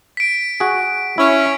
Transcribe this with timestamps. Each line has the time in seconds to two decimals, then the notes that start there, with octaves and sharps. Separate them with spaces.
0.17 B6 D7
0.60 F#4 G#4
1.18 C#4 E4